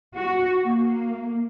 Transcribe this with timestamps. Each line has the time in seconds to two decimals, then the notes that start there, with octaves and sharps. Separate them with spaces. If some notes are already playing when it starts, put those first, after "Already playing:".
0.15 F#4
0.63 A#3